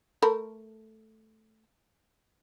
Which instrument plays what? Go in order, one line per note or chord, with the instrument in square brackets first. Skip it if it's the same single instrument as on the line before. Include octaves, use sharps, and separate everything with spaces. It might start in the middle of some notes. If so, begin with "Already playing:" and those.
[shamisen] A3 A#4 B5